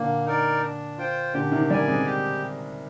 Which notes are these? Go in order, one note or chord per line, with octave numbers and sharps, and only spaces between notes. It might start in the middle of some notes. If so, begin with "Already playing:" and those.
Already playing: A#2 D3 A#3
D#4 A#4 D5
D4
F4 C5 G5
A#2 D3 G4
C3 D#3
G3 A#3 D5 G#5
G#3 C4
G4